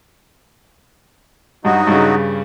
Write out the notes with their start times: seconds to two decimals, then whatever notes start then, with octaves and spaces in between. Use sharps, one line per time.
1.65 G2 F#3 D#4 F#4
1.87 G2 C#3